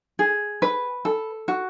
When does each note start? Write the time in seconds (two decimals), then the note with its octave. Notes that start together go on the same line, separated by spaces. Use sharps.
0.19 G#4
0.62 B4
1.05 A4
1.48 F#4